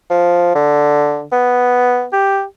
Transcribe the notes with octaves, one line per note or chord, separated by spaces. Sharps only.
F3
D3
B3
G4